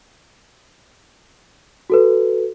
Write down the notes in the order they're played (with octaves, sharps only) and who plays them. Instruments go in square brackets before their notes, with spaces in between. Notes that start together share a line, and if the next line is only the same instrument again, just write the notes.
[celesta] F#4 A4 B4